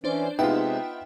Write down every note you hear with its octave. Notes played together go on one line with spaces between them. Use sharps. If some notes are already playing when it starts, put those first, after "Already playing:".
E3 C#4 D4 C5 D5
C3 G#3 B3 D#4 F4 E5 G5